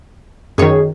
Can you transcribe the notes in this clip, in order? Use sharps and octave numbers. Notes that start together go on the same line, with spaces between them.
F#2 D#3 G#4 C#5